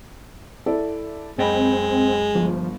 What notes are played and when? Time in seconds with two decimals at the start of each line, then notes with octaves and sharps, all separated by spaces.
0.66 E4 A4 D5
1.38 F#2 G#3 C4 D#5 G5 B5
2.35 G1 F3